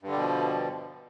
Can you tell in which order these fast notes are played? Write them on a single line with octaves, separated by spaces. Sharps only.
G2 D3 G3 B2 F3